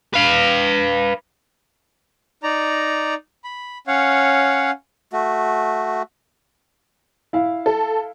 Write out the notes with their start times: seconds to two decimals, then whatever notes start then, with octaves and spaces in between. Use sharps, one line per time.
0.14 B4 F5
2.43 D#4 D5 A#5
3.44 B5
3.87 C#4 C#5 F5 F#5
5.12 A3 F#4
7.33 E4 F5
7.66 A4